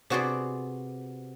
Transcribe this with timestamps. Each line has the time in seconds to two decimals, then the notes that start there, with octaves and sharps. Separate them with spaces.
0.10 C3 B3 F#4 G#4 D5 C6